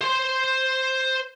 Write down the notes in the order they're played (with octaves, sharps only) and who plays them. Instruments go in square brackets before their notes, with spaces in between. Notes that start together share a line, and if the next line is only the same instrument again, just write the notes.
[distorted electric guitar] C5 C6